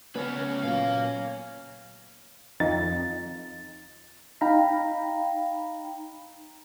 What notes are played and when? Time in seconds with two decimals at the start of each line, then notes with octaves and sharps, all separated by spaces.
0.16 C#3 B3 C#4 B4
0.63 A#2 F#3 A#4 F5
2.60 F2 D#4 A6
4.41 D#4 F5 G5 A#5 B5